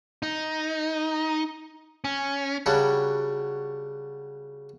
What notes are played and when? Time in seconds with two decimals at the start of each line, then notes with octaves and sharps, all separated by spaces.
0.23 D#4
2.04 C#4
2.66 C#3 F#3 G3 D4 F#4